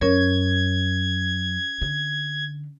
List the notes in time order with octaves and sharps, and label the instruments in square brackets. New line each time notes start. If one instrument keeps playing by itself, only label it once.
[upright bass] F#2 [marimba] C#4 A#4 C#5 [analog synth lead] G#6
[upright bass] D3